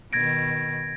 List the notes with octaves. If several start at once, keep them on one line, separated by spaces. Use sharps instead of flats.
B2 D#3 G#6 A#6 D7